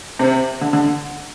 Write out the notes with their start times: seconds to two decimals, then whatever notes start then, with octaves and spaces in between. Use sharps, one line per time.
0.19 C3
0.61 D3
0.73 D3